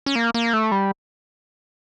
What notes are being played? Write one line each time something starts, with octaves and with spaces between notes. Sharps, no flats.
C#4
A#3
A#3
A3
G3